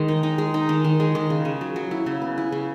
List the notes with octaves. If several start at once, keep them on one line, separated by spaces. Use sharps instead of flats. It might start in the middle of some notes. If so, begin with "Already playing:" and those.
Already playing: D#3 G#3
D#4
D#4
G#3
D#4
D#3
D#3
G#3
D#3
C#3
C#3
F#3
F#3
E4
C#3
B3
E4
C#3